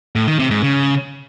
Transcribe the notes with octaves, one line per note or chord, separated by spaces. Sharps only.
A2
D#3
C3
G#2
C#3